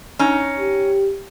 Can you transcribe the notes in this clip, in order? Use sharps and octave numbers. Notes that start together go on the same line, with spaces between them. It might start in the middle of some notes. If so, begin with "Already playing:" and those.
C#4 D#4
G4